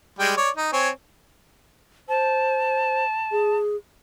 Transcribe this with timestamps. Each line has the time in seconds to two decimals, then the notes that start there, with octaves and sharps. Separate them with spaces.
0.19 G3 G#3 G5
0.37 C#5 D5
0.57 D#4
0.73 C4 C#5 G#5
2.09 C5 A5
3.32 G#4